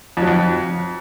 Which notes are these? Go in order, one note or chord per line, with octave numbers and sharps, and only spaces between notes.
F2
F#3
F2